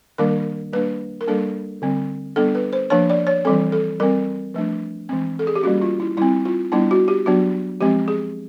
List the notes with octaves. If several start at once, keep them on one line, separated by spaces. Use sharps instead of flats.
D#3 G3 A#3 D4 A#4
G3 A#3 D4 B4
A#4
G3 A#3 D4 A4
D3 G3 C4
G3 B3 D4 A4
B4
C5
F3 A#3 D4 C#5
D5
C#5
E3 G3 C4 A4
A4
G3 C4 A#4
F3 A3 D4
E3 G#3 C4
A4
G#4
G4
G3 A#3 C#4 F#4
F4
E4
G3 C4 E4
F4
G3 B3 D4 E4
F#4
G4
F#3 B3 D4 F#4
F3 G#3 C4 G4
G#4